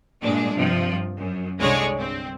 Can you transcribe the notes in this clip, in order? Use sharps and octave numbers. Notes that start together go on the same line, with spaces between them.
G2 A#2 G#3 D4
G2 C3 F3
F#2
C2 D3 G#3 G#4 C#5 D5
G2 C4